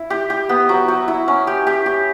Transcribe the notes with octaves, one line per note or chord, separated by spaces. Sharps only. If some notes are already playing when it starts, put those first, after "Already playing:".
Already playing: E4
G4
G4
B3
F#3
F#3
E4
C#4
G4
G4
G4